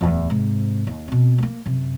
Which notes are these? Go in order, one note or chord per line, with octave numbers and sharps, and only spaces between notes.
D1 E2
G#2 C3
D#2
B2 C4
G2 A#3
F#2 C3